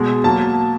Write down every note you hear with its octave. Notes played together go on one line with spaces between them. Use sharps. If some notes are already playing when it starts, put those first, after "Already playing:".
Already playing: B2 G#3
F#3 A#3 A5